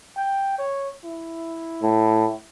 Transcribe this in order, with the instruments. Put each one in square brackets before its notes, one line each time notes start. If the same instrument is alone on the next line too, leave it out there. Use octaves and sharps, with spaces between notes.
[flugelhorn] G5
C#5
E4
[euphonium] A2